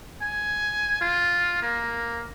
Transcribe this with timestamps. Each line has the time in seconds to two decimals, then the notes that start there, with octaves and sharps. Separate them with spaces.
0.22 G#5
1.01 F4
1.63 A#3